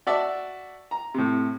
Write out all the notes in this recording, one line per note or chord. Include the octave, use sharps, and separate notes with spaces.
F#4 D5 E5 A5
A#5
A2 C3